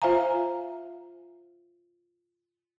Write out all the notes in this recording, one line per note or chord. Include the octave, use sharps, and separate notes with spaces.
F4 C5 E5 F5 G#5 A#5